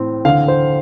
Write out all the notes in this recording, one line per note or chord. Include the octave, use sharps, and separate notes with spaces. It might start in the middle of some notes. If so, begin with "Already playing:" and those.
Already playing: A2 C4
D3 F5
C5